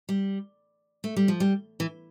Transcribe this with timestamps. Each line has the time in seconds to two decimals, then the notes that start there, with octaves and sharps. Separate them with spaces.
0.09 G3
1.04 A3
1.17 G3
1.28 F3
1.40 G3
1.80 E3